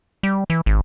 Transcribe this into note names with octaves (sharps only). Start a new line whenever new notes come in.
G3
E3
G#1